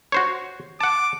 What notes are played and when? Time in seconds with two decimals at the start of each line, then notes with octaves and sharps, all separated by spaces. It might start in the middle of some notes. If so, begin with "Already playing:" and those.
0.12 F#4 C5 C#5
0.81 F#5 A5 D6